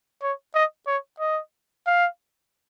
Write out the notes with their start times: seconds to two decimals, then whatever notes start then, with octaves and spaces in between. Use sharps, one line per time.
0.23 C#5
0.55 D#5
0.87 C#5
1.20 D#5
1.87 F5